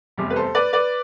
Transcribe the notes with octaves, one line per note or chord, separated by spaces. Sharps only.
F1 E2 C3 G3
B4
A4 C5
B4 D5
B4 D5